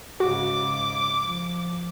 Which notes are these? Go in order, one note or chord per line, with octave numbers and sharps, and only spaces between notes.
G#2 C#3 F#4 D6
F3